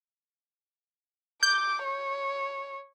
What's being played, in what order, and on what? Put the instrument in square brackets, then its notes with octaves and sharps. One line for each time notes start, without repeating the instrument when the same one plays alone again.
[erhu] D6 [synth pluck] G6
[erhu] C#5